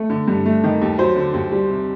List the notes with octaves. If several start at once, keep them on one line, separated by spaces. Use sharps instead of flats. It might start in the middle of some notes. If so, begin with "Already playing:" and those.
Already playing: A3
D3
G2
A3
D#3
D#2
F#3 C5
D3
D#2
G3
C3